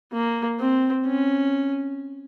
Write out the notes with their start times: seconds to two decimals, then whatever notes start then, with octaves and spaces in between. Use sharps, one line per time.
0.12 A#3
0.59 C4
1.06 C#4